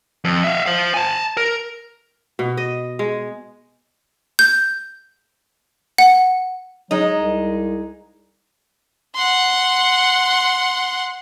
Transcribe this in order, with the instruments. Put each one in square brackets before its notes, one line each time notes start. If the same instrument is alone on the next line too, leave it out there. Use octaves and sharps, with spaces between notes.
[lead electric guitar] F2
E5 F5
C5 F5
G#5 A5
A#4
[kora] B2
D#5
G#3
[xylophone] G6
F#5
[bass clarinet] F#3 [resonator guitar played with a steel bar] G#3 D#4
[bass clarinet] C2
[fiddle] F#5 C6